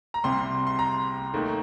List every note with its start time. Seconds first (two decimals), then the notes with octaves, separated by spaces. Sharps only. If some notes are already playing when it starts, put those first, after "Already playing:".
0.14 A#5
0.24 C2 C3 G3 C4 C6
0.67 C6
0.79 A#5
1.34 D#2 D#3 A3